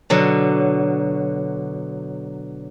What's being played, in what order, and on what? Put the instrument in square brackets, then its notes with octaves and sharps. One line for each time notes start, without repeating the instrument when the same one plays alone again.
[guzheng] B2 D3 F#3